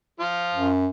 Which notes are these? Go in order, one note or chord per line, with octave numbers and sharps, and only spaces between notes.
F3 F4
F#2